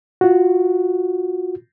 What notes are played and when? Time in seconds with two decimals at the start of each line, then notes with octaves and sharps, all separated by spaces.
0.21 F4 F#4